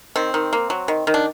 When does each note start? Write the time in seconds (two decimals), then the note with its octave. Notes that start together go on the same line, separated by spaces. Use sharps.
0.16 D#3 C4
0.34 D#3
0.53 A#3
0.70 F#3
0.88 D#3
1.07 D#3
1.14 D4